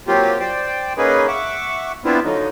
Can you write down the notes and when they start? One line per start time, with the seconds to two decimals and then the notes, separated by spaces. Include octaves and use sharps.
0.08 F#3 A#3 C4 F4 G4
0.40 C5 D5 G5
0.97 A#3 C#4 D#4 G#4 B4
1.28 E5 F#5 C#6 D6
2.05 B3 C4 D4 E4 F4
2.24 D3 F3 F#3 D#4